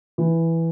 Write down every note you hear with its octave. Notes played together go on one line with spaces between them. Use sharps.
E3